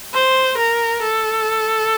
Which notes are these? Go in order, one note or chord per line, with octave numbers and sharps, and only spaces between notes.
C5
A#4
A4